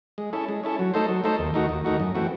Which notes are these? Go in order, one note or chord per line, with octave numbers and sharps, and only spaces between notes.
G#3
C#4 E4 A4
G#3
C#4 E4 A4
F#3
A3 D#4 A4 C5
F#3
A3 D#4 A4 C5
D#2
D#3 A3 D#4 F#4
D#2
D#3 A3 D#4 F#4
F#2
E3 A3 C4 F#4